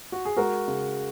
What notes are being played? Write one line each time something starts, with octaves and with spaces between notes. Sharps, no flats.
F#4
G#4
G#3 F#4 A#4
C#3